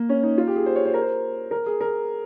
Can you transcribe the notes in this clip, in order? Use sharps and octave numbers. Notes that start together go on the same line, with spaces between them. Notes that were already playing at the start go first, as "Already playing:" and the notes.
Already playing: A#3
C#4
D#4
F4
G4
G#4
C5
C#5
C5
A#4
C5
A#4
G#4
A#4